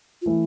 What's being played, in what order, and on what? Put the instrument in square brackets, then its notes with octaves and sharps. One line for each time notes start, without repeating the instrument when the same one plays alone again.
[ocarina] F4
[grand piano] E3 A3 [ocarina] E4